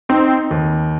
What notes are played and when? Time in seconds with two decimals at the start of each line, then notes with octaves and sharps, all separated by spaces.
0.09 C4 D#4
0.51 D#2